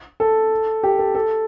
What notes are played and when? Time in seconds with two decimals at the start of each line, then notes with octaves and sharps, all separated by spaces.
0.20 A4
0.83 G4
0.99 A4
1.15 A4